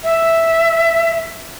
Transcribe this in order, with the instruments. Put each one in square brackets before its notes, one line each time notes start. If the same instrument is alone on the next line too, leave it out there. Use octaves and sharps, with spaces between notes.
[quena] E5